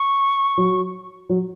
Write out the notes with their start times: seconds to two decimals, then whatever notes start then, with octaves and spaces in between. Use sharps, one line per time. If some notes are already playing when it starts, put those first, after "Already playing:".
Already playing: C#6
0.58 F#3
1.29 F#3